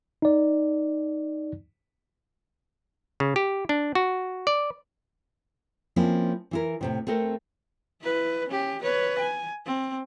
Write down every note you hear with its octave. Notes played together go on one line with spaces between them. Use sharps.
D#4 D5
C#3
G4
D4
F#4
D5
F3 A#3 C4 C#4 E4
E3 E4 A#4
A2 C3 D#3
A3 C4 A4 A#4
E4 B4
C#4 G4
B4 C#5
G#5
C4